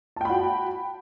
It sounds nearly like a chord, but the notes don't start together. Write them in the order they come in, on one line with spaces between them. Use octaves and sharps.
A5 G5 B5 F#4